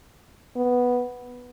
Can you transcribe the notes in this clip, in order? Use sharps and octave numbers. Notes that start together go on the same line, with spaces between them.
B3